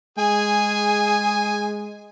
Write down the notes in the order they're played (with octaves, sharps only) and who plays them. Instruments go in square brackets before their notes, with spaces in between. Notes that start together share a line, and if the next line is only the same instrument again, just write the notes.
[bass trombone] G#3 [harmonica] G#4 G#5